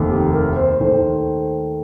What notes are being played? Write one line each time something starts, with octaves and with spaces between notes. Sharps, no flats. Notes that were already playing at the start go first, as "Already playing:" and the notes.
Already playing: F1 D#2 D#3 A3
G4
A#4
C5
D#2 D#3 A3 C5